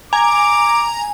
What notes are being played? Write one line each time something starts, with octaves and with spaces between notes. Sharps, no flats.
G#5 A#5 D6